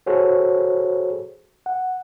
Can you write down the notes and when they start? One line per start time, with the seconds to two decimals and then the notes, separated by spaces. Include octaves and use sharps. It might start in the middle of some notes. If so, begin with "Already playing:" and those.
0.06 F#4 G#4 A4 C5 C#5
1.66 F#5